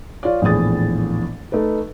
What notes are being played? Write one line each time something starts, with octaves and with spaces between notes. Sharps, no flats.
F4 C#5 D5
A#1 E2 A2 G#4 D#6 A6
A3 D#4 B4